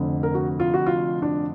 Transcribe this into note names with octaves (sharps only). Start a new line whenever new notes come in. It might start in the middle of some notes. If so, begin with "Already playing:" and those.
Already playing: F1 F2 D3
A#4
F#4
F4
F#4
F4
D4